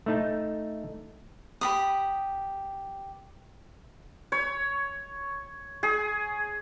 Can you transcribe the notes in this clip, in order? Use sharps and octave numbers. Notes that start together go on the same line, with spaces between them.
A3 D#4 A5
G4 B5 D#6
C#5
G#4